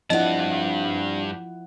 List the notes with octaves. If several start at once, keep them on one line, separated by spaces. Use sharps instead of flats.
G2 F3 C4 D4 E4 D#5 F#5 A5